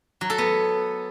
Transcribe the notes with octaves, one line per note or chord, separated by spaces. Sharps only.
F#3
A4
B3